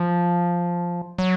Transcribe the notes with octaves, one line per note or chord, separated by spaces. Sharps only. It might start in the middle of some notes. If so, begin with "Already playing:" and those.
Already playing: F3
F#3